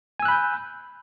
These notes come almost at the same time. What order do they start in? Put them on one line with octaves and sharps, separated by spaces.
G#5 E6 F#6 B5 G6